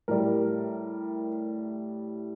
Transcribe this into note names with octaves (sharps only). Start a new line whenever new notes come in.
A2 G3 A#4